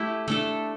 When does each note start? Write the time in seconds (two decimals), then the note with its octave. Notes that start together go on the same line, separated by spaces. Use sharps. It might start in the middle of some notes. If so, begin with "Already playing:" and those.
Already playing: A3 E4 G4
0.28 A3 D4 A4